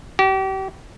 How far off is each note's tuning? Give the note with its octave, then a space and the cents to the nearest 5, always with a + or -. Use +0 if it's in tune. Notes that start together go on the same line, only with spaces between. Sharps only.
G4 -35